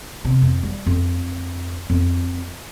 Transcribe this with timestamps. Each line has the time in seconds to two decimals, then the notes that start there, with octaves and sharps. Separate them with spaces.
0.25 C3
0.42 F2
0.63 G3
0.87 F2
1.90 F2